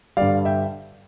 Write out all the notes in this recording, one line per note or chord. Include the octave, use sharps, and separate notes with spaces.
G2 D3 G3 D5 F5
E5 G5